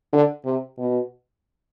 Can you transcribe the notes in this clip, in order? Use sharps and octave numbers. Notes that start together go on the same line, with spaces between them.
D3
C3
B2